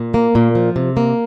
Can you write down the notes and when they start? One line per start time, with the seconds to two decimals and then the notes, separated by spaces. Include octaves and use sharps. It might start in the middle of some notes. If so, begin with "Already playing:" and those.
Already playing: A#2
0.14 A#3
0.35 A#2
0.55 F3
0.76 C3
0.97 A#3